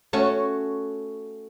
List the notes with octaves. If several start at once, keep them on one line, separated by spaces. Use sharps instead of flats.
A3 C#4 F#4